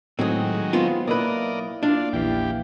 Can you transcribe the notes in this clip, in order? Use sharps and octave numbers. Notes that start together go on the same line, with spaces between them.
A2 D#3 F#3 G#3 C4 G#4
B3 C4 F4
B1 A#3 E4 A#4 B4 D5 D#5
D4 F4 D5
A#1 E2 E3 G4 F5